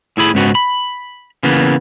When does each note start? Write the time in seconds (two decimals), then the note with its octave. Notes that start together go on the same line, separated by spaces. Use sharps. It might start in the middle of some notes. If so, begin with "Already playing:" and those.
0.17 A2 E4 G#4 B5
0.34 C#2 G#2 C#3 B3 F#4
0.55 B5
1.43 C#3 E3 A#3 B3